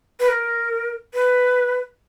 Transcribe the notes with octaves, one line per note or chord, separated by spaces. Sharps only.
B4
A#4
B4